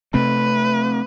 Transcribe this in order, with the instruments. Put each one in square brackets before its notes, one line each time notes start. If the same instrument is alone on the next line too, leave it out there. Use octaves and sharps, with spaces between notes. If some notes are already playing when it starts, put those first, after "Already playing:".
[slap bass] C3 A3 C4 [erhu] B4